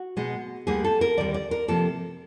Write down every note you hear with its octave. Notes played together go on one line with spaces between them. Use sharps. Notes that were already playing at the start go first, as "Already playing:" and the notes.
Already playing: F#4
B2 G#3 B3
D2 D3 G3 A#3 G#4
A4
A#4
D#2 D3 G3 D5
D5
A#4
C3 F3 A#3 A4